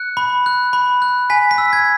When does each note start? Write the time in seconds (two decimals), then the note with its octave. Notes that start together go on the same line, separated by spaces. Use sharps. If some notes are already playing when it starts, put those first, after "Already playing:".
Already playing: F#6 C#7
0.17 B5
0.46 F#6
0.73 B5
1.02 F#6
1.30 G#5 B6
1.51 B6
1.58 E6
1.73 G#6